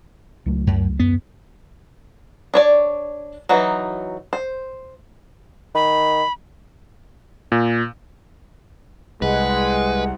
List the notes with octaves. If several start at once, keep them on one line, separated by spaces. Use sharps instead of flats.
C#2 F#3 A3
F#2
D1 F#2 B3
D4 C#5 D5
E3 F#3 D#4 F#4
C5
D#3 B5
A#2
C2 G#3 B4 F#5